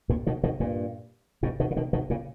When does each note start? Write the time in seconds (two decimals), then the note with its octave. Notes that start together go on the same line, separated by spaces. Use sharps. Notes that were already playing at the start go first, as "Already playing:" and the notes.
0.09 G2 A#2
0.26 B2 D#3
0.43 B2 D#3
0.60 G2 A#2
1.43 G#2 B2
1.60 B2 D#3
1.71 C#3
1.76 B2 D#3
1.93 B2 D#3
2.10 A#2 C#3